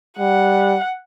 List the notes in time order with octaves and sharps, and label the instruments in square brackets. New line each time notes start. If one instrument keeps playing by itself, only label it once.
[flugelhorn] G3 [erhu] F#5